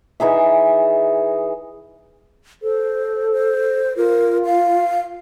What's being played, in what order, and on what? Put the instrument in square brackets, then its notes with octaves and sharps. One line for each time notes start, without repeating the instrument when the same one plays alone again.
[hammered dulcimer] E3 D#4 G#4 E5
[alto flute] A4 [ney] C5
[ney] C5
[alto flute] F4 [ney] A#4
[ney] F5